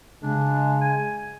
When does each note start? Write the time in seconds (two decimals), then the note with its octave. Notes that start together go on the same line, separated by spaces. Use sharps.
0.23 C#3 G#3 D4
0.81 G#5